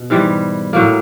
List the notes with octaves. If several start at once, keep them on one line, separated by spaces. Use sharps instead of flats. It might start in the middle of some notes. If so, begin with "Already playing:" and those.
Already playing: B2
G#2 E3 G3
A2 F#3 A#3